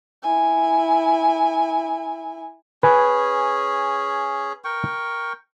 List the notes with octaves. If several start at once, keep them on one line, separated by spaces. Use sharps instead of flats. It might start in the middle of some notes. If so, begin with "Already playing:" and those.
E4 G#5
C#4 G#4 B4 G#5
A#4 G5 C#6